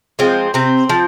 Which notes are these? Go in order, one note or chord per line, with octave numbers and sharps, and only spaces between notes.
F3 G#3 C4
C3 C4
F3